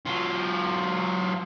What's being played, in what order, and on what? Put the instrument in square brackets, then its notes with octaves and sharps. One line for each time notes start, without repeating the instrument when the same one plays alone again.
[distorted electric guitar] F#3 F4